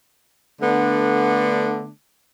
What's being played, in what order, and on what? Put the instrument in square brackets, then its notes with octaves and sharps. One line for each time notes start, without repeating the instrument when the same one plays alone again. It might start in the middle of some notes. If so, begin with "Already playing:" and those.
[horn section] D3 A3 B3 D4